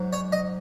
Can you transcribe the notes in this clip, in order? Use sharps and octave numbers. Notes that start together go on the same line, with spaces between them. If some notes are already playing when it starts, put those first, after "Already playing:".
Already playing: G#2 F#3
C#5
D#5